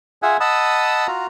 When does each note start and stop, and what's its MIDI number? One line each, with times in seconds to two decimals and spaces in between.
0.22 0.37 65
0.22 0.37 68
0.22 0.37 76
0.22 0.37 78
0.22 0.37 80
0.40 1.07 75
0.40 1.07 78
0.40 1.07 81
0.40 1.07 83
0.40 1.07 87
0.40 1.07 88
1.07 1.27 65
1.07 1.27 66
1.07 1.27 82